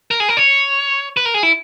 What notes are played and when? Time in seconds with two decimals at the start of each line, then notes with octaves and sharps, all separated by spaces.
0.11 A#4
0.20 G#4
0.29 A#4
0.37 C#5
1.17 B4
1.25 A#4
1.34 G#4
1.43 E4